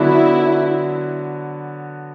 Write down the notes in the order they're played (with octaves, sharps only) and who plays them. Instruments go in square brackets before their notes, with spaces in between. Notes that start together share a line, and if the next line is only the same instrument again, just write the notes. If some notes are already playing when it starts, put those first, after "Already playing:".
Already playing: [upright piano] D3 F#3 B3 D4 F#4 [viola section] E4